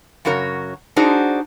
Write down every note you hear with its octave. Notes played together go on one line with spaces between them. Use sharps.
F#2 C#3 F#4 A#4 C#5
D4 D#4 F#4 G#4 C5